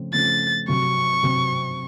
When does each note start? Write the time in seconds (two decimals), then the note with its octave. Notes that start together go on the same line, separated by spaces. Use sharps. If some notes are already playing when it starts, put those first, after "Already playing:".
Already playing: C#3 F3 A3 C4
0.13 C#3 F3 A3 C4 A6
0.67 C3 F#3 C4 C#6
1.22 C3 F#3 C4